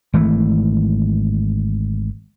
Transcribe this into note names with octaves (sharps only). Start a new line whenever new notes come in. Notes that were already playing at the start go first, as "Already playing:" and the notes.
G#1 E3 A3